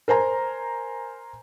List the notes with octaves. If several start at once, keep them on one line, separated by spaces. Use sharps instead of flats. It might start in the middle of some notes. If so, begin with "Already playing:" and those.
A#4 C5 G#5 A#5